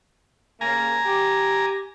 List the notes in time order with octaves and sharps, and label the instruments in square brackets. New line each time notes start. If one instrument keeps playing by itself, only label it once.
[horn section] C#3 A#3 [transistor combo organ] G#5 A#5
[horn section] G4